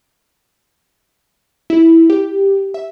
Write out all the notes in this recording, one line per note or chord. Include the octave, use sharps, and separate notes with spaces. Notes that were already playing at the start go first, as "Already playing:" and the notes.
E4
G4
E5